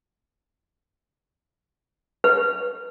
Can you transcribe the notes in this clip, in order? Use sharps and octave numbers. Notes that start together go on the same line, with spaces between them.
B4